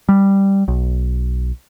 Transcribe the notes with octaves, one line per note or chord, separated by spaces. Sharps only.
G3
B1